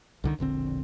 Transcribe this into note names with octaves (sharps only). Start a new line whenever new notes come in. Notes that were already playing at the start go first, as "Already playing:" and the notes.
C2 D3 D#3
E1 A#1 D3 C4